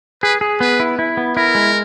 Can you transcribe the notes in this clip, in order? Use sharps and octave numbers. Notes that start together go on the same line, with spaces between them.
G#4 B4
G#4
B3 B4
E4
E4
B3
E4 A#4
G#3